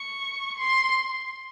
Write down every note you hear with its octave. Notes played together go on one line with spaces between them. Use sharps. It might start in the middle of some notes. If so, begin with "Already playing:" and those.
Already playing: C#6
C6